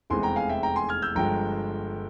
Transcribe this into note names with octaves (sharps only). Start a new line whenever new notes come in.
F1 E2 E3 G#3 C4 G#5 C6
G5 A#5
F5 G#5
E5 G5
G5 A#5
G#5 C6
F6 G#6
E6 G6
G1 G2 F3 G#3 G5 A#5